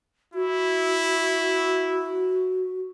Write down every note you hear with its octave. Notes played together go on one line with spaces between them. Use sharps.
E4 F#4